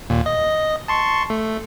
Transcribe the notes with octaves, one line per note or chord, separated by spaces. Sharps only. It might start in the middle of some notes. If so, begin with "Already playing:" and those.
D#2 A#2
D#5
A5 C6 C#6
A3